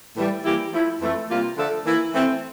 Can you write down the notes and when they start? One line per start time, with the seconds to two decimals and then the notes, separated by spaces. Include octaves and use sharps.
0.16 A2 E3 G3
0.45 E3 G3 A#3 E4 G4
0.73 F3 A3 E4
1.01 F2 E3 A3
1.29 C3 G3 A#3 F4
1.57 D3 F3 A3 D4 A4
1.86 E3 A#3 E4
2.14 E3 A3 C4